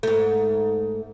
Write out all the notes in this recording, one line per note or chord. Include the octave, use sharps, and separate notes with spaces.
G#2 A3